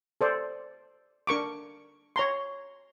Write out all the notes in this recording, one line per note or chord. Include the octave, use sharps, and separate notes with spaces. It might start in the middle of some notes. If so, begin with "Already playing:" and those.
A4 C5 D5
D4 A#4 C#6 D6
C#5 A#5 C6